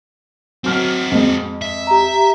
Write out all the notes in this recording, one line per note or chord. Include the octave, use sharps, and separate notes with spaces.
F#3 C4 F#4 F6
F2 G#3
E5
G4 A#5